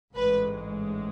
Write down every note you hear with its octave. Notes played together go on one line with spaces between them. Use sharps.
A1 G#2 G#3 B4